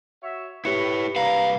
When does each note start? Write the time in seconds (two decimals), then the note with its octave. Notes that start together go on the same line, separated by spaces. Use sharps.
0.23 F#4 C#5 E5
0.65 E4 G4 B4 C#5 C#7
1.16 C2 D4 B4 F5 A#5